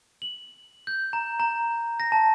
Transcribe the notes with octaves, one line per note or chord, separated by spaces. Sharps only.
F#7
G6
A#5
A#5
A#6
A5